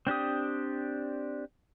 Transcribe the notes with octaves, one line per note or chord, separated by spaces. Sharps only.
C4 D4 G4 D#6